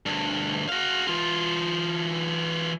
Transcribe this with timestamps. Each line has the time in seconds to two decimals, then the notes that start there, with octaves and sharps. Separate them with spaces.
0.06 D2 G2
0.69 F#4 F5
1.07 E3 F4